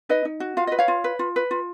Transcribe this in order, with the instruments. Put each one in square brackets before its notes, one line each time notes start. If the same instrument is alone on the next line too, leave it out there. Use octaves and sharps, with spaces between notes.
[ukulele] D#4 B4 D#5
D#4
F#4
F4 F5
B4 D#5
C#5 F5
F4
B4
F4
B4
F4